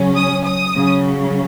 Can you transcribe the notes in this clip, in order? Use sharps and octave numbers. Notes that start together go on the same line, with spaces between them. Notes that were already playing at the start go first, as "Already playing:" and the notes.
Already playing: C#3 F#3 C#4
D#6
D#6
C#3 F#3 C#4